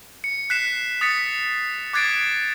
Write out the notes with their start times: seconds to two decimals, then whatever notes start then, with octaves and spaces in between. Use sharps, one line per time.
0.24 C#7
0.50 F#6 B6 C7 E7
1.01 D#6 A6 B6 C#7
1.93 D6 F#6 G#6 A6 C7 D7